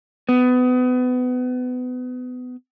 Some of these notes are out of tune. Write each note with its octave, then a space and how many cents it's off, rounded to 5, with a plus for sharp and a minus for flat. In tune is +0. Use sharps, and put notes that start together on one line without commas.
B3 +30